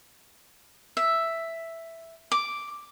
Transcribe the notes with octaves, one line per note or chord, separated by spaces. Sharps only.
E5
D6